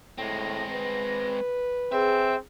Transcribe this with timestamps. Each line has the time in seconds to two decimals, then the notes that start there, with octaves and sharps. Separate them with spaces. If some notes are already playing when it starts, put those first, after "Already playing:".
0.18 A2 G#3 C4 A#6
0.72 B4
1.92 C4 G#4 E5